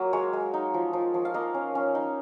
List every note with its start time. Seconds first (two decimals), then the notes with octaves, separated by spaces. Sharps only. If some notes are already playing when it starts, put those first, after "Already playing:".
Already playing: F#3 A#3 A#4
0.13 G#3 C#5
0.33 G#3
0.54 D#4
0.74 F3
0.93 F3
1.14 F3
1.25 F5
1.34 A#3 D#5
1.54 C#4
1.75 C#4
1.95 D#4